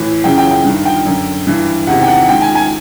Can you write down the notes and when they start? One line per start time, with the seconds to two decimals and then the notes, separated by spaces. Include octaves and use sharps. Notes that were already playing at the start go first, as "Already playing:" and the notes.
Already playing: A2 E3
0.24 F#2 C#3 E3 G5
0.38 G5
0.51 G5
0.65 G2 D#3
0.86 G5
1.06 F#2 D3
1.47 G2 E3
1.87 E2 C3 D#3 F#5
2.02 G5
2.08 F#5
2.28 G#2 D#3 G5
2.42 G#5
2.55 G#5